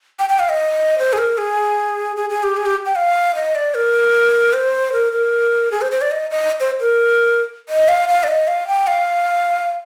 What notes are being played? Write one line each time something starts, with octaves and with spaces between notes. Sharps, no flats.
G5
G5
F5
D#5
C5
G#4
A#4
G#4
G#4
G#4
G4
G#4
G4
G5
F5
D#5
D5
A#4
C5
A#4
A#4
G#4
C5
C5
D5
D#5
D#5
C5
A#4
D#5
F5
F5
D5
D#5
F5
G5
F5